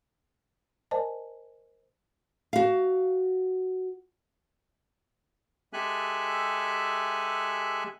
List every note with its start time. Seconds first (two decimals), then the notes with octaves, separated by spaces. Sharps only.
0.91 A#4 C5 D5 D#5 G#5 A5
2.53 F#4 F5
5.73 G#3 G4 A4 E5 G#5 F#6